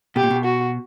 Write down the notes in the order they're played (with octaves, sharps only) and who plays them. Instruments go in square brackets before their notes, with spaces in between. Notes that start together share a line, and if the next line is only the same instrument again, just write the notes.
[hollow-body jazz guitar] B2 [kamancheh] G4
[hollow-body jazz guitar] A#2
B2
[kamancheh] F#4